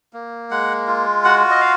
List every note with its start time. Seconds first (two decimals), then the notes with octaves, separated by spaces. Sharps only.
0.13 A#3
0.51 G#3 F#5
0.87 F4
1.24 F#4 F#5
1.51 D#5
1.61 F5